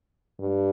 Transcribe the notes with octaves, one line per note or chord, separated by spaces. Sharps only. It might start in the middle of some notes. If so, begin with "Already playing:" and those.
G2